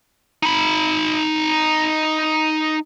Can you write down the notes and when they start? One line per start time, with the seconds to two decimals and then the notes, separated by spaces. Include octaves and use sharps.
0.43 D#4 B5